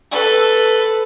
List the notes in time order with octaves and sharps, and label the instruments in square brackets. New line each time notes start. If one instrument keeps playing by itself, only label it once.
[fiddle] A4 B4